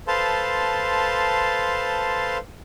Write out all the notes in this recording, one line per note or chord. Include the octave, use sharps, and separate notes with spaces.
A4 B4 C5 F5 A5 C6